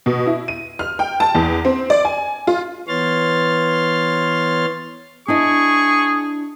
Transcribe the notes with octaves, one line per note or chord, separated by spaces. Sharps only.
B2
E4
D#7
F6
G5
A5
E2
C4
D5
G#5
F4
E3 B3 C#5 C6 F6 A6
D4 E4 G#4 D#5 C#6